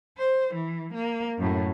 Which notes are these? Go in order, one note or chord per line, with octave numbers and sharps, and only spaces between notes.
C5
E3
A#3
F#2 A2